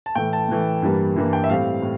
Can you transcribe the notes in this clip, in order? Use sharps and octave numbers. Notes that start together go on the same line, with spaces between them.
A5
A2 E3 A3 G5
A5
A2 E3 A3
G2 E3 G3 A#3
G2 E3 G3 A#3
G5
E5
A2 G3 C4 F5
A2